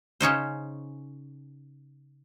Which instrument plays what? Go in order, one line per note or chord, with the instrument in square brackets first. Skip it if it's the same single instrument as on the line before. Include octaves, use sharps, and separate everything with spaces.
[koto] C#3 C#4 D#4 C5